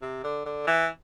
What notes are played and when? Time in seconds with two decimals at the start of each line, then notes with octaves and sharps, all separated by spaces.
0.02 C3
0.24 D3
0.46 D3
0.67 E3